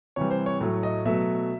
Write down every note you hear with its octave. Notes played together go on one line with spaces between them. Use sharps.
C3 E3 G3 C#5
C5
C#5
A2 F#3 A3
D#5
B2 F#3 A3 E5